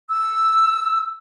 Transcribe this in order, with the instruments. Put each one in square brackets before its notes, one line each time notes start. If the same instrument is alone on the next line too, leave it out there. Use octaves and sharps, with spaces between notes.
[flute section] E6